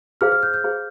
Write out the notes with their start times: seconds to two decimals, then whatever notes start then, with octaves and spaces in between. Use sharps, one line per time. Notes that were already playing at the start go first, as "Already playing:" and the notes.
0.21 G#4 C5 F5 F6
0.32 F6
0.43 G6
0.54 G6
0.64 G#4 C5 F5